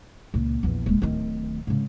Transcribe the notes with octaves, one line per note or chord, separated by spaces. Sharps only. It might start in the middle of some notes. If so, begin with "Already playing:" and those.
C#2 A#2
A#1 E2
D#1 G#3
D1 D#3
G#2 C#3